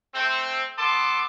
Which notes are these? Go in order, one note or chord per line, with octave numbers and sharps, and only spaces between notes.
A3 C4
B3 A4 A5 C6 D6